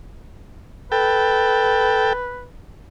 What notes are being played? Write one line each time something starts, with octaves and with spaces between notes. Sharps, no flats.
A4 B4 G5